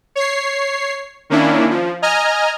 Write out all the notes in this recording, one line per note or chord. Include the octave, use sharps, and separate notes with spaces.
C#5 C7
D#3 A#3 C#4 D4 E4
F3
D#5 G#5 A#5 F6